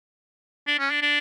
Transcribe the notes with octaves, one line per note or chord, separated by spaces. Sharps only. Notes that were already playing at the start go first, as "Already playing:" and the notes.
D4
C#4
D4
D4